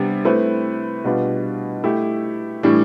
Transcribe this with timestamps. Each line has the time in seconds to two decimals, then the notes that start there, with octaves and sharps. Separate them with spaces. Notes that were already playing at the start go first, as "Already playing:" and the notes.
Already playing: C3 G3 B3 D4
0.25 A3 C4 E4 B4
1.04 B2 G3 D4 F4 B4
1.84 A3 E4 G4
2.63 A2 E3 G3 D4